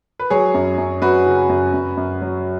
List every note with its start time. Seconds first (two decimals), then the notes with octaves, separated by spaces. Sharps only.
0.19 B4
0.30 F#3 G#4 C#5
0.54 F#2
0.78 F#2
1.02 F#2 F#4 B4
1.26 C#3
1.49 F#2
1.73 F#2
1.97 F#2
2.21 F#3